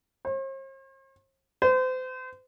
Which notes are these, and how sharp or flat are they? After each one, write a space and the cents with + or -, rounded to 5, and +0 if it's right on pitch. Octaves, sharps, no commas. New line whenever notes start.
C5 +45
C5 -35